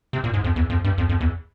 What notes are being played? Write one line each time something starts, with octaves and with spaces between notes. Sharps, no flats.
C3
A#2
G#2
F2
E2
F2
G2
F2
F2
E2